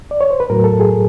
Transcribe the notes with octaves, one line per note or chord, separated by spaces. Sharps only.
D5
C#5
C5
B4
A2 F#3 A#4
A4
G#4